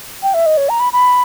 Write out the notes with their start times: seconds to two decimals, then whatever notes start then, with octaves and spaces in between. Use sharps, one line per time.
0.23 G5
0.34 E5
0.46 D#5
0.57 C#5
0.69 A#5
0.80 B5
0.93 B5